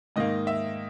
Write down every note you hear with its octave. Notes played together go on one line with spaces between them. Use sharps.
G#2 D#3 A#3 D#5
E5